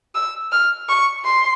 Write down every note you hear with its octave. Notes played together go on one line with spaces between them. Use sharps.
E6
F6
C#6
C6